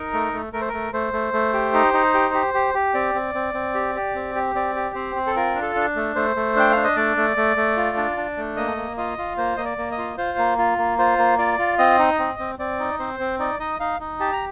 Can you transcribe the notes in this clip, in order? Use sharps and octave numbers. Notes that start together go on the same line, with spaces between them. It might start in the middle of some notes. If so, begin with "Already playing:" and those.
Already playing: D#4 A#4
A3
A3
A3 A#4
C5
A3 A#4
A3 C5
A3
A3
G4
D#4
D#4
G4
G4
G4
G4
C4 D5
C4
C4
C4
G4
G4
C4
G4
C4 D5
G4
C4 C5
C4
A4
F4 A#4
D4
A4
D4
A3
A3 C5
A3
D4 G5
D4 F5
D#5
A3 D5
A3
A3
A3
F4
D4
D4
A3
A#3 D#5
A#3
F4 D#5
F4
A#3 C5
A#3 D#5
D5
A#3
D#5
F4
F4 C5
A#3
F4
A#3
F4 C5
A#3
F4 D5
F4
C4 D#5
D#4
C4
C4
C4 D5
D#4
C4 C5
C4
D#4 D5
D#4 D#5
D#4 F5
D#4
G4 A5
A#5